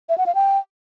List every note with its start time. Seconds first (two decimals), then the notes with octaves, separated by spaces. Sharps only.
0.09 E5
0.18 F#5
0.26 F5
0.35 G5